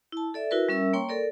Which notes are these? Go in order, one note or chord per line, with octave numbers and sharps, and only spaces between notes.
E4 A5
A4 D5 E5
E4 F#4 A#4 B4 E5
G3 C#4 A#4 E5 E6
A#3 C#5 G5 C6 C#6
A4 A#4 D5